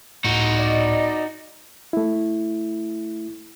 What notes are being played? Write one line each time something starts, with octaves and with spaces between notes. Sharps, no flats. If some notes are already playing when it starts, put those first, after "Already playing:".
C#2 A2 D#4 F#4
D5 D#5
A3 E4